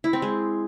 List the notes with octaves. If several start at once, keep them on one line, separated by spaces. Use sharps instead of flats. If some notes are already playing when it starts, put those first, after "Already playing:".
E4
C4
G#3